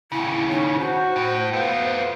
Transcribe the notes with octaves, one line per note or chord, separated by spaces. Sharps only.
D#2 C#3 E4
C#4 D#4
F#4 C5
A2
A3 B3 F4